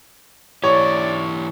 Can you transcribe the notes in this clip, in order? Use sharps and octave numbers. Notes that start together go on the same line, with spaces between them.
E3 E4 G4 C#5 D5